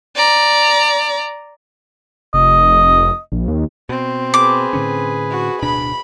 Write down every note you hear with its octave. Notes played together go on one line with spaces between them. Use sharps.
D5 A#5
F1 D#5
A#1
D#2
B2 C4
G#4 B4 D6
A2 D3 C#4
F#4
D1 B2 D4 B5